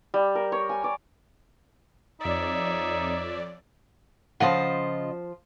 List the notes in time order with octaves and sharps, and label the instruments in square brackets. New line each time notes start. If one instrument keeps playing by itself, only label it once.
[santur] G3
A#4
C#5
G#5
D5
[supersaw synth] F2 D5 [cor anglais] D#4 [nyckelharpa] C#5 E5
[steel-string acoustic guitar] C#3 F4 D#5 [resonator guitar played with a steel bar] F3 C5 [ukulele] F#5